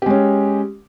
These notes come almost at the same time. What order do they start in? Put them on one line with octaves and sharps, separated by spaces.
G4 G#3 C#4